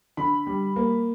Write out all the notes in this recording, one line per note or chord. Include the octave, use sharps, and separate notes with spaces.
D3 B5
G3
A#3